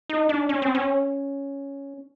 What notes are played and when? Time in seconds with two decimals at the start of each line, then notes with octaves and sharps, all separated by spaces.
0.09 D#4
0.29 D4
0.49 C#4
0.62 C4
0.75 C#4